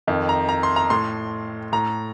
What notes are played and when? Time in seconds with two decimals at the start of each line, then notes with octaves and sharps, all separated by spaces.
0.07 F2 D#3
0.29 A#5
0.49 A#5
0.63 C6
0.76 A#5
0.90 A2 C6
1.72 A2 A#5